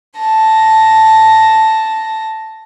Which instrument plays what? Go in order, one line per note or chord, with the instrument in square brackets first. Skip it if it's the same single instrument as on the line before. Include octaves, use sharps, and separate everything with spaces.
[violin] A5 A#6